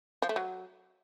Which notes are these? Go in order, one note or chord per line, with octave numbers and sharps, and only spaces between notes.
F3
A3
F#3